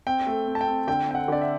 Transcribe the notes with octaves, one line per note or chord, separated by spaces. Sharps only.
C4 G5
A3
C4
A5
G5
C4
D3 G5
C4 G5
F#5
D3 D5
E5